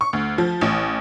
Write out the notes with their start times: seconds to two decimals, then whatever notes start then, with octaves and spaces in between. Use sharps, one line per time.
0.01 C#6
0.13 D2
0.38 F3
0.61 A1